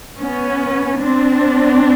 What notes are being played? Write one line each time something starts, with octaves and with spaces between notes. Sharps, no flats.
B3 C#4
C4 D4